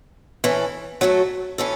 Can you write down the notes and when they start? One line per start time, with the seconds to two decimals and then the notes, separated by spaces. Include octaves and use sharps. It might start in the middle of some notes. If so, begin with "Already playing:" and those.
0.44 E3 C#4 E4 A4
1.01 F#3 A3 F#4 A4
1.58 E3 C#4 A4